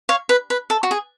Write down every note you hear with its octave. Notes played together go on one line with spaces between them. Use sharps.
C#5 F5
B4
B4
A4
F#4
G#4